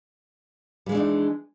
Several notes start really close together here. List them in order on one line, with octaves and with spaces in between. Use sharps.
G3 G#3 E3 D4 D#4